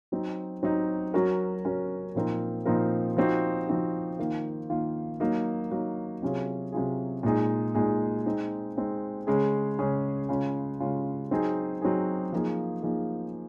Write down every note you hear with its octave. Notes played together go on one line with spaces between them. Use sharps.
F#3 C4 D#4
F#3 C4 D#4
F#3 C#4 F#4 A#4
F#3 C#4 F#4 A#4
A#2 F3 C4 D#4 A#4
A#2 F3 C4 D#4 A#4
F3 C4 D#4 F#4
F3 C4 D#4 F#4
D#3 A#3 F4
D#3 A#3 F4
F#3 A#3 D#4
F#3 A#3 D#4
C3 F#3 C#4 F4 G#4
C3 F#3 C#4 F4 G#4
A#2 G#3 D#4 G#4
A#2 G#3 D#4 G#4
G#3 C4 D#4
G#3 C4 D#4
C#3 G#3 C#4 G#4
C#3 G#3 C#4 G#4
C#3 G#3 C#4 F4
C#3 G#3 C#4 F4
F#3 C4 D#4 G#4
F#3 C4 D#4 G#4
F3 A#3 D#4 G#4
F3 A#3 D#4 G#4